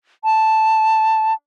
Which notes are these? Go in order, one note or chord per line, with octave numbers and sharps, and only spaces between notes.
A5